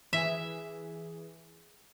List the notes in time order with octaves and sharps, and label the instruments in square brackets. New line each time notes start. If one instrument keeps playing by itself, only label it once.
[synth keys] E3 G#4 [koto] E5